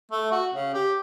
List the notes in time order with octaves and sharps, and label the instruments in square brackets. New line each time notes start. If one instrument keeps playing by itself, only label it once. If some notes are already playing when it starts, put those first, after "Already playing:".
[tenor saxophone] A3
F#4
C#3
G4